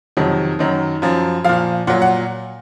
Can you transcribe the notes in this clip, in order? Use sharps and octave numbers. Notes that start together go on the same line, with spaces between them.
F2 C3 D#3 F#3
F#2 D#3 F#3
F#2 F3
A#2 F3 F5
A#2 F#3 F#5
F#5